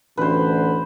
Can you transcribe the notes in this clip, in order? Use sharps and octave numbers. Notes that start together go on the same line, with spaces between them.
A1 D2 B4 C5